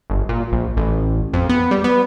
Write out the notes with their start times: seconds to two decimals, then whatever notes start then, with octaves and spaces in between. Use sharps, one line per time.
0.10 G1
0.29 A#2
0.52 A#1
0.77 A1
1.33 F2
1.49 B3
1.71 G3
1.84 B3